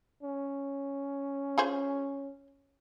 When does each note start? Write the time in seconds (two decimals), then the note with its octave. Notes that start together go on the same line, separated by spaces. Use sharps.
0.23 C#4
1.58 F4 G#4 C5